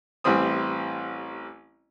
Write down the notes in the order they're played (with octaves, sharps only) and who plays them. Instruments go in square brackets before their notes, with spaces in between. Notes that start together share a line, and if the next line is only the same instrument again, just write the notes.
[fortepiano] A1 E3 G3 C4 D#6